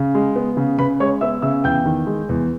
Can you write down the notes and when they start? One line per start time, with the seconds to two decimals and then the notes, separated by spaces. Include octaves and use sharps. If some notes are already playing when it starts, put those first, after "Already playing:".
Already playing: C#3
0.15 G#3
0.36 B3
0.57 C#3
0.78 C#3 B4 B5
1.00 G#3 C#5 C#6
1.21 B3 E5 E6
1.42 C#3 E5 E6
1.64 E2 G5 G6
1.86 D#3
2.07 G#3
2.29 E2